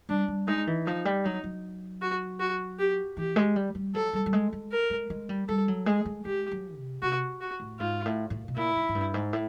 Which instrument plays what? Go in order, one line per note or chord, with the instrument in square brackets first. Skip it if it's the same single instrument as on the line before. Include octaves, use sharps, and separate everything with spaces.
[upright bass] G3 [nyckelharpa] D4
[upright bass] G3
[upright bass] G#3 [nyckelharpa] D#4
[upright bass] E3
[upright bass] F3 [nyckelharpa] D#4
[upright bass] G3
[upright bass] F#3 [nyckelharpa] D#4
[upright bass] F#3
[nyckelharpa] F#4
F#4
G4
[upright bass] E3 [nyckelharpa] G4
[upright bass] G#3
G3
G3
[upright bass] F#3 [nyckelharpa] A4
[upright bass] G3
G3
G#3
G#3
[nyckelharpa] A#4
[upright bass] G#3
G#3
G3
[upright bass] G3 [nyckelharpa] A4
[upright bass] F#3
[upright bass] G#3 [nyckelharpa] G#4
[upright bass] G#3
[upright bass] G#3 [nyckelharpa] G4
[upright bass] F#3
C3
[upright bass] C3 [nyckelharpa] F#4
[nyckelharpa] F#4
[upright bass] A2
[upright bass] G#2 [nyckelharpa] F4
[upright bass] A2
A2
B2
[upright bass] A#2 [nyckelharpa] E4
[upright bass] G#2
G#2
G2
G#2
A2